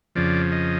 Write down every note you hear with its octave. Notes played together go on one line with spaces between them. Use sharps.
F2 C#3 F3 D5
D#5